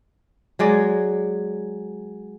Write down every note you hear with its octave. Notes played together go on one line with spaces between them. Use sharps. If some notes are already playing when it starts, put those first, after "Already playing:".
F#3 G#3 D5